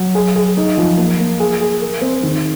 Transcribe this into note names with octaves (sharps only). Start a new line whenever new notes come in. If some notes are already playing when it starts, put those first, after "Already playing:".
Already playing: F#3
G#4
G#4
D#4
F3
A#3
A#3
G#4
G#4
A#4
C4
D#3